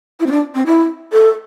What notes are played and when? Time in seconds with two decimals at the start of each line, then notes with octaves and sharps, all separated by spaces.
0.20 E4
0.26 C4
0.32 D4
0.55 C4
0.66 E4
1.13 A4